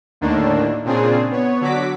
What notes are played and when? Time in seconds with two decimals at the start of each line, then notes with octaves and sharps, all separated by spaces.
0.21 D#2 A2 D3 D#3 A#3 D4
0.85 A#2 C#3 C4 D4 F4 G#4
1.31 B3 C#5
1.61 D3 F#3 F#4 D6 B6